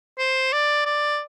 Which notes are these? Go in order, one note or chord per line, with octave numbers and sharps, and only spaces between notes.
C5
D5
D5